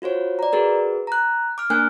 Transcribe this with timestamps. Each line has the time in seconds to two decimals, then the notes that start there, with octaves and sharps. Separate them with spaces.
0.02 F4 F#4 C5 C#5
0.39 D5 A#5
0.53 F#4 G#4 A#4 B4
1.07 A#5 F#6
1.58 D6 F6
1.70 A#3 D4 A#4 G#5 F6 F#6